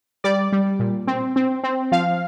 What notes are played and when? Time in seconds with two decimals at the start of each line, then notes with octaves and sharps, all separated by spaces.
0.24 G3 D5
0.52 G3
0.79 A#2
1.07 C4
1.36 C4
1.64 C4
1.92 F3 F5